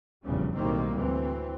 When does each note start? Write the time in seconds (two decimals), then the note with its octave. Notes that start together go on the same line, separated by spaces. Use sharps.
0.23 F1 A#1 E2 C#3 G3
0.55 B1 A2 D#3 G3 A#3 C4
0.96 D2 E3 C4